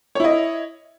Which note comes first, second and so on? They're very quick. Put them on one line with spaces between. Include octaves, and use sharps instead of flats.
C#5 E4 D#5